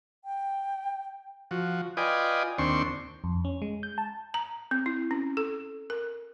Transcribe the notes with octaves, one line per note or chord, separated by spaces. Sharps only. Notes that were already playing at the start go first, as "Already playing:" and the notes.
G5
F3 F#4
F4 B4 D5 D#5 G5 G#5
D#2 C4 D4 C6 C#6
F2
C#4
G#3
G6
A5
A#5
C4
E4
C#4
A4
A#4